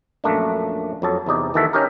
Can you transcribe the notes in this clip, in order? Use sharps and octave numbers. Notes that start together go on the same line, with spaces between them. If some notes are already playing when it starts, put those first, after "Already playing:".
A#1 F#2 A3 A#3 D4
F2 F#3 A5
E2 C3 D#4 D5
D#2 D#3 E3 F#4 A4 E5
C#4 D#4 G4 A#4